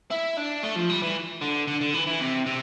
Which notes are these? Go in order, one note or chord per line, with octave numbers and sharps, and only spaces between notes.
E4
D4
A3
F3
G3
E3
D3
D3
D3
E3
E3
C3
C3